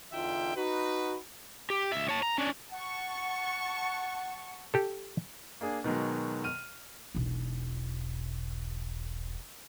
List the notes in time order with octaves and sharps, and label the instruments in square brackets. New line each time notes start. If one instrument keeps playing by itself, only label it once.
[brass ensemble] E2 D3 D#4 F4 E5 G5
D#4 F#4 B4
[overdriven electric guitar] G4
C#2 E5
C#5 A5
A#5
C#4 D4
[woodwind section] F#5 [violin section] A5 C#6
[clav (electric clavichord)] G4 A4
[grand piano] A#3 D4 G#4
B2 D#3 F#3 G#3
F6 D#7
[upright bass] E1 B1